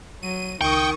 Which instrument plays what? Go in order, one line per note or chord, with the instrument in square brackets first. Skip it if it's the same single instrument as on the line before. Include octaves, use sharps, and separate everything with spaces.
[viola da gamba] F#3 [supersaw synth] D#7
[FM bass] C#2 [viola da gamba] D#3 [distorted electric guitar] G5 [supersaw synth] C#6 D#6